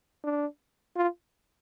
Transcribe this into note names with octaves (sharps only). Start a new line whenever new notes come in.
D4
F4